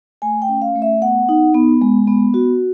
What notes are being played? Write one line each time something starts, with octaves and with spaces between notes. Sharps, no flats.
A3 G#5
G5
C#4
F5
A3
E5
B3 F#5
D#4
B3
G#3
B3
F#4